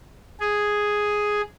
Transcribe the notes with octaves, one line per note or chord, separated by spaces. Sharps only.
G#4